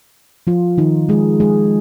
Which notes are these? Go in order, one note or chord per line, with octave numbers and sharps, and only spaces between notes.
F3 F4
D#3 D#4
G#3 G#4
G#3 G#4